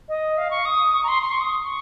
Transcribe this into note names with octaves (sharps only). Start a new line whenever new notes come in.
D#5
F5
C#6
D#6
C#6
A#5
C6
C6
C#6
D#6
C#6